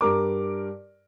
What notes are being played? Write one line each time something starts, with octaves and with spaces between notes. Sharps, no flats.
G2 A#4 D6